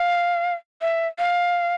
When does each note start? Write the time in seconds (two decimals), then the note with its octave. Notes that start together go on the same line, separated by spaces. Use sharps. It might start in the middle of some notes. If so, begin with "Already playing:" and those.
Already playing: F5
0.81 E5
1.18 F5